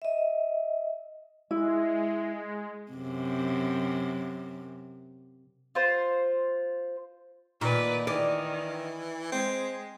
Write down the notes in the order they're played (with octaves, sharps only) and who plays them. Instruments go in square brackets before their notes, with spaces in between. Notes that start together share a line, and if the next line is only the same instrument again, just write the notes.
[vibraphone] D#5 E5
[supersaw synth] G#3 [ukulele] E4
[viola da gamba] F#2 C3
[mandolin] F4 C5
[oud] A#2 [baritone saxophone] D#3 [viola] B4 D5
[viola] D#3 [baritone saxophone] E3 [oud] D5
[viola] G#3 [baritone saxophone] C4